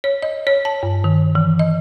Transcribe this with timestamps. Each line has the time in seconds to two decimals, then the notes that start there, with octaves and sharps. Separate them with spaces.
0.04 C#5
0.23 D#5
0.47 C#5
0.65 A5
0.83 G2
1.04 D#3
1.35 E3
1.59 D#5